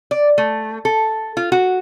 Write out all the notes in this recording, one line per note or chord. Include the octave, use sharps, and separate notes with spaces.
D5
A3
A4
F4
F#4